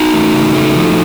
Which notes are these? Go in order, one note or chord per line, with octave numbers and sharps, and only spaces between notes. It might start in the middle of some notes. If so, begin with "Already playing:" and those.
Already playing: D#4 F#4
A3
C#3
A3
F3